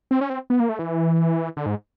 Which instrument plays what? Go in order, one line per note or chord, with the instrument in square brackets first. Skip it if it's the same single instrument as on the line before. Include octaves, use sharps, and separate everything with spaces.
[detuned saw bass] C4
C#4
C4
B3
A#3
A3
E3
D3
G#2